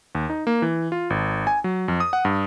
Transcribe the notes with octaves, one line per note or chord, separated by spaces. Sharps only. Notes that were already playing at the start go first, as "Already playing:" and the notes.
D#2
D#4
A#3
E3
F4
G#1
G#5
F#3
F2
D#6
F#5
G2